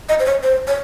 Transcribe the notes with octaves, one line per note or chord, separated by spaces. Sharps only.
D#5
C5
C#5
C5
C#5